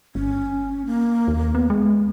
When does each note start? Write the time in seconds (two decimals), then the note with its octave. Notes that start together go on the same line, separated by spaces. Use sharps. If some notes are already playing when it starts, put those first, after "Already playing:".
0.15 G1 C#4
0.86 A#3
1.28 D#2
1.55 B3
1.70 G#3